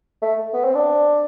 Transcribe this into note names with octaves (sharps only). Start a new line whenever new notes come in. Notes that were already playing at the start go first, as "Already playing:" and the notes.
A3
B3
C4
D4